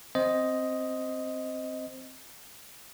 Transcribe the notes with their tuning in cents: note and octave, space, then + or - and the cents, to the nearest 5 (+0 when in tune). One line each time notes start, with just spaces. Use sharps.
C4 +0 C5 +0 D#5 +5